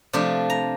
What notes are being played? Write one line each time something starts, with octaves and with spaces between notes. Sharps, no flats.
C3 F3 A3 D4
A#5